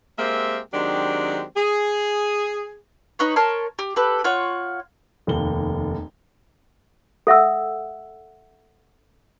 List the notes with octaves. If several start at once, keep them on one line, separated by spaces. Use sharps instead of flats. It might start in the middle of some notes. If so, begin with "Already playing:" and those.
G#3 A#3 C4 G4 A#4 E5
D#3 F#3 G#3 C4 D4 G4
G#4
D#4 B4 C#5
A#4 C#5 A5 C6
G4
G4 A4 B4
F4 C#5 F#5
F1 D#2 G7
A4 E5 F#5 E6